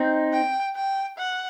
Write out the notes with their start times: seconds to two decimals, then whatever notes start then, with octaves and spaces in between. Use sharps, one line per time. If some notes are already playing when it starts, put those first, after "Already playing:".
Already playing: C4 D#4
0.33 G5
0.76 G5
1.18 F#5